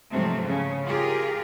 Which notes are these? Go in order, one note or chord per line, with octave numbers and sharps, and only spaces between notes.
G#2 C3 F3 F#3 A3 C4
C#3 C#4
F4 G4 G#4 A#4